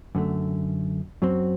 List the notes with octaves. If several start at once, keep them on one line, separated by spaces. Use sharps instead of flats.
F#2 D3 A3
F#2 F#3 C4